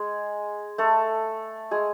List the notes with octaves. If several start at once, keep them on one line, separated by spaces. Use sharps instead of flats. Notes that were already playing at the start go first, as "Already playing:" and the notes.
Already playing: G#3 G#4
A3 A4
G#3 G#4